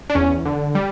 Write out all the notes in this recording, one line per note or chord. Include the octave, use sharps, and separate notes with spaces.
D4
E2 C#4
D3
G3